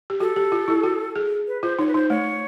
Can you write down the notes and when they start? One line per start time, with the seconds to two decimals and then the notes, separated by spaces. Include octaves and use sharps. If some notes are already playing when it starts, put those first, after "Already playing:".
0.10 G4
0.20 F#4 A4
0.36 G4
0.52 F4
0.68 E4
0.83 F#4
1.16 G#4
1.47 B4
1.62 F4 C5
1.79 D#4 C#5
1.88 B4
1.94 D#4 C5
2.10 A3 C#5